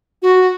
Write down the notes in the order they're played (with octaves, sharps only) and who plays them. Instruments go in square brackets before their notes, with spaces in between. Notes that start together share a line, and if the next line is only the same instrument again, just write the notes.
[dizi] F#4